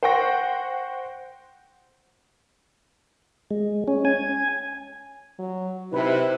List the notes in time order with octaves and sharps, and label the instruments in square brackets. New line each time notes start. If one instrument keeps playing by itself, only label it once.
[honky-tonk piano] C5 F#5 G5 C#6 A#6
[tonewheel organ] G#3
C#4
G#5
[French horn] F#3
[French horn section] C3 [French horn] D#4 [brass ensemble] E4 [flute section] B4